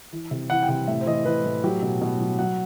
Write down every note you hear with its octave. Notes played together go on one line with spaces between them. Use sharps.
E3
C3
E3 F#5
G5
C3 F#5
A2 E5
C5
E3 D#5
E3 B4
A2
F#3 G4
B2
B2
F#3
F#3 F#5